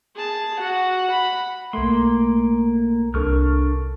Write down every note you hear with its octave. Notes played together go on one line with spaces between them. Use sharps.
G#4 A5
F#4 F#5
B5
B1 A3 A#3 C6
C2 D4 A4 A#4 C#6 F6